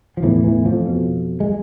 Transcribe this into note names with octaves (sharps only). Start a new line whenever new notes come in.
F3
E2 A2 E3
E2 E3
F2 F3
B2
G#3